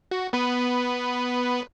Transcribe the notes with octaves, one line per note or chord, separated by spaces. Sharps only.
F#4
B3 B4